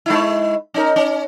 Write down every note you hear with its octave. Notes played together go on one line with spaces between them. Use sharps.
G#3 D#4 E4
C#4 D#4 A#4
C#4